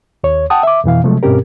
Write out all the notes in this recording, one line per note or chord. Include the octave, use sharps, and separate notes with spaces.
D#2 C#5
F#5 G5 A5 D#6
E5 D6
F2 B2 E3 F5
C3 F3 F#3 G#3 A3
G2 B2 C4 C#4 G4 A#4